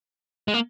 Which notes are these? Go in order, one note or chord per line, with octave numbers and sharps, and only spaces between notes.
G#3
A#3